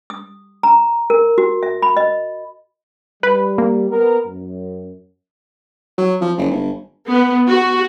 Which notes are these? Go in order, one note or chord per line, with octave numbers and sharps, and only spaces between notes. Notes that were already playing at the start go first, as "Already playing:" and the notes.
D#6
A#5
A#4
F#4
E5
B5
D#5
G3 B4
A#3
B3 A#4
F#2
F#3
F3
F#1
G1
B3
F#4